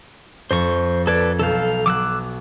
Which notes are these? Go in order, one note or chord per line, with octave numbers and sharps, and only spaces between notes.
F2 C5 C#6 A#6
A4 B4 D5 G#6
B1 A4 F5 G6
F#3 D6 E6 F#6